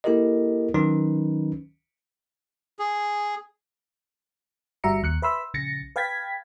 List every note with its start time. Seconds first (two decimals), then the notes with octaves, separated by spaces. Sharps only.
0.04 A#3 E4 G4 A4 A#4 D#5
0.74 D#3 F#3 C#4 D#4 B4
2.79 G#4
4.84 G1 G3 F#4 E5 A#5 C#7
5.03 D#2 F#6 C#7
5.22 B4 E5 B5 C6 E6
5.54 A#1 C#3 A6 A#6 C#7
5.96 B4 F5 G5 G#6 A6 B6